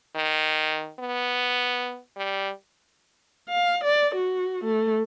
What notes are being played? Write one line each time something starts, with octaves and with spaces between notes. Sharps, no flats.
D#3
B3
G3
F5
D5
F#4
A3